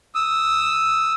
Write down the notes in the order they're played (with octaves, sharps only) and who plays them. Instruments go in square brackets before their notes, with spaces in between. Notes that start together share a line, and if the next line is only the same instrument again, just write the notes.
[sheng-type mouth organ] D#6 E6